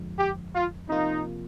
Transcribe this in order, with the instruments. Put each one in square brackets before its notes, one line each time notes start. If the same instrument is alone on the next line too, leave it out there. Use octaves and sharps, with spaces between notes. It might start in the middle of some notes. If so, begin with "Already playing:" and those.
Already playing: [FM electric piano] G1 F2 D3 F3 G#3
[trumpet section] G4
F4
[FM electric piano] C3 F3 A#3 F4 [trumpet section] D#4